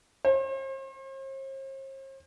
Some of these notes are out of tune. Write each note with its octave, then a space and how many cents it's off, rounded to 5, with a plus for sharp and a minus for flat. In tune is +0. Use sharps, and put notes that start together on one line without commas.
C5 +45